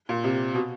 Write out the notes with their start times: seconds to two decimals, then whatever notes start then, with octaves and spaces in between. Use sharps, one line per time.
0.09 A#2
0.24 C3
0.54 B2